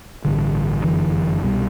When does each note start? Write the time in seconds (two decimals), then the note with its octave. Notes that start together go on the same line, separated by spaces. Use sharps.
0.25 A1 G2 D3
0.84 G1 F#2 D3 E3
1.44 C2 B2 G3